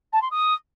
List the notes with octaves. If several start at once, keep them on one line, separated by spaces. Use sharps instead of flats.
A5
C6
D#6